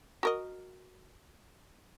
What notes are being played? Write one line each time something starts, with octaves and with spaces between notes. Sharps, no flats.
F#4 A#4 D#5